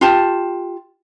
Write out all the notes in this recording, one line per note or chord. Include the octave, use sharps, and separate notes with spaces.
F4 G4 A5